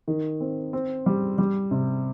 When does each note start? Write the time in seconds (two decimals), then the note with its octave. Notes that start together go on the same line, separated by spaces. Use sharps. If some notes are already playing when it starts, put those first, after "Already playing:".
0.08 D#3
0.41 C4
0.73 C4
1.06 G3
1.38 G3
1.71 C3